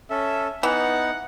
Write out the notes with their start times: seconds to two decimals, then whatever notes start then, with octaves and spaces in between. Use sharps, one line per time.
0.10 C#4 A4 E5
0.63 E3 B3 D#4 F#5